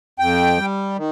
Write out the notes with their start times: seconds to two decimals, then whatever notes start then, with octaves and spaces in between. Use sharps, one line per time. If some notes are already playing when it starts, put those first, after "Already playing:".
0.19 F2 G5
0.58 G3
0.97 D#3